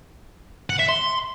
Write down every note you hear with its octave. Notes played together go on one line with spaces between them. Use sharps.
F#5
E5
C6